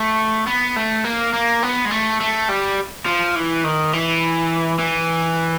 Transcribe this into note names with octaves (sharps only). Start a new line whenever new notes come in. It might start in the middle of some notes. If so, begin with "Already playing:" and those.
Already playing: A3
B3
A3
A#3
A#3
B3
G#3
A3
A3
G3
F3
E3
D#3
E3
E3